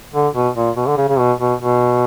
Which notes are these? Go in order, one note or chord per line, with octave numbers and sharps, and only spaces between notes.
D3
B2
A#2
B2
D3
C#3
C#3
B2
B2
B2